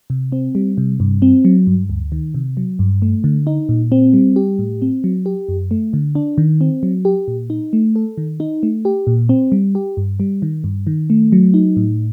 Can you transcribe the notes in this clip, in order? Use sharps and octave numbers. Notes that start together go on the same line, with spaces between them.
C3
C4
G3
C3
G2
C4
F#3
G2
D2
D#3
C3
F#3
G2
A3
D3
D#4
A#2
C4
G3
G4
A2
C4
F#3
G4
F#2
A3
D3
D4
D#3
C4
F#3
G4
A#2
D#4
A3
A4
D#3
D#4
A3
G4
A#2
C4
G3
G4
G2
G3
D#3
G2
D#3
A3
F#3
D#4
A2